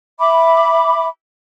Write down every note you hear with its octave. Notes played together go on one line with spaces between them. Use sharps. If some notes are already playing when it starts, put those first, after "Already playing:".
E5 B5 D6